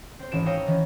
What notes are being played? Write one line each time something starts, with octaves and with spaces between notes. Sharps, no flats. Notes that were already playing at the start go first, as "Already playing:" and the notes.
C4 C5
G#1 E3 C#4 D7 E7
C#5 F5 G5 A#5 D#6 E6
D#3 E3 C#4